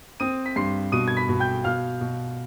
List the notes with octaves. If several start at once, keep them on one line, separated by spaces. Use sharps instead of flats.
C4 D#6 D#7
B6
G2 C6 C7
B2 D#6 D#7
G#6
B5 B6
B2
G5 G6
B2 F5 F6
B2